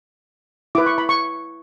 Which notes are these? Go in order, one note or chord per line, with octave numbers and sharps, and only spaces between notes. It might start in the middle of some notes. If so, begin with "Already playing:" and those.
E4 B4 D6
C#6
B5
C#6